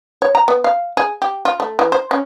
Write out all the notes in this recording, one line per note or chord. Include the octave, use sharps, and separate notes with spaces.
C#5
A#5
B3
F5
G#4
G4
F4
A3
E3
C5
C#4